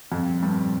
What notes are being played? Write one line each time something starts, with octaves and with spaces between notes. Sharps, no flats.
F2 A#2 G3 C4
G2